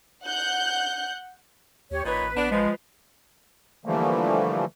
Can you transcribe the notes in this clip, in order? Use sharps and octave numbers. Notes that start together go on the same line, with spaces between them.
F#5 F#6 G6
D#2 G4 C#5
A1 A#2 D#4 B4 C#5
A1
A1 B3 D4
F3 G#3
D3 E3 F3 G3 A3 A#3